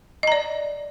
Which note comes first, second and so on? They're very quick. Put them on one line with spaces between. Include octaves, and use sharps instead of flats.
D#5 A#5 D5